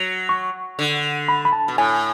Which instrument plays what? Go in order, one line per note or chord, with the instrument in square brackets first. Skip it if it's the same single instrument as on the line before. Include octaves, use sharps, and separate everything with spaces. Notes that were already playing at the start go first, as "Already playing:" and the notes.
Already playing: [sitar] F#3
[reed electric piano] C#6
[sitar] D3
[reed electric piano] B5
B5
A5
[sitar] B2
[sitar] A2 [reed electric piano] G#5